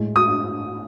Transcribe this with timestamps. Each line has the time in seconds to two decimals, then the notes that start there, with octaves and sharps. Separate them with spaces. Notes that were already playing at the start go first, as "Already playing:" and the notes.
Already playing: A2 G#3
0.16 D#6